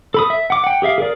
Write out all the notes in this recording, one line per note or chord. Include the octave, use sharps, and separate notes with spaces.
A4 B5 D#6
E5
F#5 D6
F#5 G5
G4 G#4 E5 F5
G#4 A#4 D5